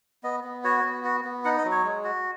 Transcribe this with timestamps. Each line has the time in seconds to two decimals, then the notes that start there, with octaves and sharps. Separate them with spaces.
0.23 B3 D#5
0.44 B3
0.64 F#4 C#5
0.84 B3
1.04 F#4
1.24 B3
1.45 D#4 F#5
1.58 D#5
1.65 F#3
1.72 C#5
1.84 G#3
2.04 F#4